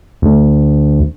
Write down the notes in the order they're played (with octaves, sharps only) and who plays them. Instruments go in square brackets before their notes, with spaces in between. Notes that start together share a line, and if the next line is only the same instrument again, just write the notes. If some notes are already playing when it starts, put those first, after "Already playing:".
[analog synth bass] D2